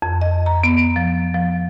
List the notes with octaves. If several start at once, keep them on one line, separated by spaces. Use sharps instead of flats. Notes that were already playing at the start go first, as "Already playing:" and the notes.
F2
D#5
A#5
B3
F3
F3